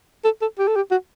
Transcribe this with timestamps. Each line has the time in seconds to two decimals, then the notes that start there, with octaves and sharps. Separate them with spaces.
0.25 A4
0.41 A4
0.59 G4
0.67 A4
0.76 G4
0.91 F#4